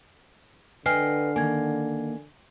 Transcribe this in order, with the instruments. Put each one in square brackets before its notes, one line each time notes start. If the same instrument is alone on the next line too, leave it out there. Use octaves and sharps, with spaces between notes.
[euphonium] D3 [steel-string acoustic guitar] B4 D#5 G5 [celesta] G#5 F6 C7
[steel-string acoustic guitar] D#3 A#3 [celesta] G#5 G#6